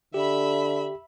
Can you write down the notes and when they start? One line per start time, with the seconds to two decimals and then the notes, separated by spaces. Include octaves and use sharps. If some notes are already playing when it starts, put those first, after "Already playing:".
0.14 D3 G4 E5 B5